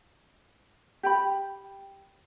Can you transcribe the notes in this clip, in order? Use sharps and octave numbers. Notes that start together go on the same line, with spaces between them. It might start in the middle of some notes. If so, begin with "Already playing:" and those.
G4 G5 B5